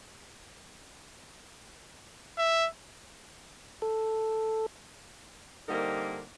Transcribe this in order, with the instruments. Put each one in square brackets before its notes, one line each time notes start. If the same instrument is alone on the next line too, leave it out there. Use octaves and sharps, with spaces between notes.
[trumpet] E5
[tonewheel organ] A4
[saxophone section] D3 G3 A#3 C4 D#4 A#4